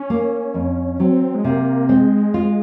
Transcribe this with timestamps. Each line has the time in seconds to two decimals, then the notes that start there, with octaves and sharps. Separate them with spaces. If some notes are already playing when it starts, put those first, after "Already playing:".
Already playing: C#4
0.10 A#3
0.54 F2
0.99 F#3 C4
1.35 G#3
1.44 C3 A#3
1.89 G#3 C4
2.34 F4